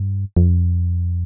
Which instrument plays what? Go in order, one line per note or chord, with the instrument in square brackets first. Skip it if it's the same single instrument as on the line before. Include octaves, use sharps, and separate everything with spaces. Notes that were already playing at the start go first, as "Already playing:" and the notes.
Already playing: [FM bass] G2
F2